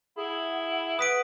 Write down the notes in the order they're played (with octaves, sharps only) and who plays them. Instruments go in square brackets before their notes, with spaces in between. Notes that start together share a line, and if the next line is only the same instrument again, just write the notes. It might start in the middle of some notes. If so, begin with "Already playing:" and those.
[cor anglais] E4 [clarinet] G#4 [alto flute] F#5
[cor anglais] B4 [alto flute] F#5 [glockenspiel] D#6 B6 D7